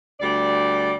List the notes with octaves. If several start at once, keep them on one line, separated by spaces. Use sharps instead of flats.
D2 G3 D5